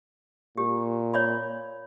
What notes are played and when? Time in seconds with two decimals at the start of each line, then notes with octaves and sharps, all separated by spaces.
0.57 A#2 G4
1.14 C#5 D5 B5